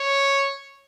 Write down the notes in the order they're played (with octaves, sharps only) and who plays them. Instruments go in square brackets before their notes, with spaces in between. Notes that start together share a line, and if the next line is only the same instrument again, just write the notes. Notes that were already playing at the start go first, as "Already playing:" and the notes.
Already playing: [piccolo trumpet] C#5